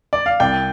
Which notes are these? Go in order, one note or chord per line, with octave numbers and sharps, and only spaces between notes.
D5
F5
C2 D5 G5